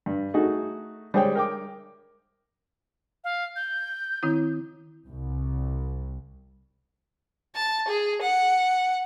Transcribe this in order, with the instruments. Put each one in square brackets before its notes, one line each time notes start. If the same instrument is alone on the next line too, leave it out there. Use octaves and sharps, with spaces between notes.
[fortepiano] G2
A3 D#4 F#4 G#4
G3 G#3 G#4 C5 C#5 G5
A#4 G5 D6
[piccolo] F5
G6
[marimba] D#3 C4 E4
[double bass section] C2
[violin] A5
G#4
F#5